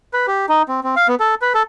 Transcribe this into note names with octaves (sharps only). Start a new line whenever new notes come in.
B4
G4
D#4
C4
C4
F5
B3
A4
B4
A4